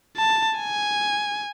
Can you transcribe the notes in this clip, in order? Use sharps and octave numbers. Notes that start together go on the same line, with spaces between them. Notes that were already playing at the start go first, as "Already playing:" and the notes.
A5
G#5